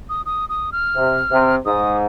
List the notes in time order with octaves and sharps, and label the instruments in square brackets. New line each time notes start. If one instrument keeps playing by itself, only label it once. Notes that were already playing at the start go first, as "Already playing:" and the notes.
[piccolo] D#6
D#6
D#6
F6
[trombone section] C3
C3
[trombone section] G#2 [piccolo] D#6